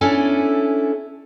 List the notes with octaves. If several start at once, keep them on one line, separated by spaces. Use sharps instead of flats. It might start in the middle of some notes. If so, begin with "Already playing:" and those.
C#4 D4 E4 A4 G#5